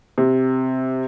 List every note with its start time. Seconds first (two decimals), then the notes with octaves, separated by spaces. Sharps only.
0.18 C3